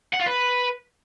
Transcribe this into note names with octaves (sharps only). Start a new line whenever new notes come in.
F#5
F4
B4